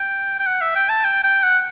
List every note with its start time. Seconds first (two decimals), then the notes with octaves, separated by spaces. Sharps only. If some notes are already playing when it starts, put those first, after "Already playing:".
Already playing: G5
0.39 G5
0.46 F#5
0.61 E5
0.75 G5
0.89 A5
1.04 G5
1.23 G5
1.43 F#5